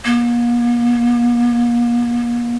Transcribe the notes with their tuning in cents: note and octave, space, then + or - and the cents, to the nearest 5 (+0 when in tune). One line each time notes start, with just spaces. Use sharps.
A#3 +40